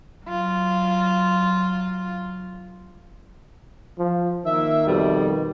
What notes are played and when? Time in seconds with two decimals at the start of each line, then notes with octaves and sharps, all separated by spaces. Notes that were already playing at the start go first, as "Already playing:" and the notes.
0.26 F#3 F4
3.99 F3
4.46 D#3 A#3 E5
4.86 F2 B2 G3